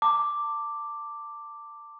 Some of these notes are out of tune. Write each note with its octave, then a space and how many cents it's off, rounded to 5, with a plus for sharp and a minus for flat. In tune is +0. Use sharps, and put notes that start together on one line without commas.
A5 +35 D6 +0